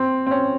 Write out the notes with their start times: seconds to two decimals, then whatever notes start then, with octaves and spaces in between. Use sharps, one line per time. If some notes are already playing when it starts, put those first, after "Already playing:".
Already playing: C4
0.27 C4
0.31 C#4